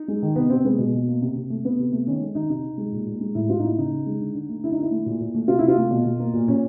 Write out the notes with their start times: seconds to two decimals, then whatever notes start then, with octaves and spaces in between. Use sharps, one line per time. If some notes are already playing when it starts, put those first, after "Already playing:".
Already playing: D#4
0.08 G#3
0.22 D#3
0.36 C3 B3
0.50 C3 C4
0.64 G#3 B3
0.78 B2
0.94 B2
1.08 A#3
1.22 C3
1.36 C3
1.50 A3
1.64 C3 B3
1.79 C3
1.92 A3
2.06 D#3 C#4
2.21 G#3
2.35 D#3 D#4
2.50 C3 D#4
2.64 C3
2.78 G#3
2.92 A#2
3.07 A#2
3.21 G#3
3.35 A2 E4
3.49 A2 F4
3.59 D#4
3.64 A#3 E4
3.78 C#3 D#4
3.91 C#3
4.06 G#3
4.21 D3
4.35 D3
4.49 A3
4.64 D3 E4
4.72 D#4
4.77 D3 E4
4.91 A3
5.06 A#2
5.21 A#2
5.34 A3
5.48 C3 F4
5.59 C3 E4
5.68 F4
5.77 A3
5.91 B2
6.05 B2
6.20 A#3
6.34 A#2
6.48 A#2 C#4